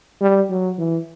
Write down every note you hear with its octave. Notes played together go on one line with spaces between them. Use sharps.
G3
F#3
E3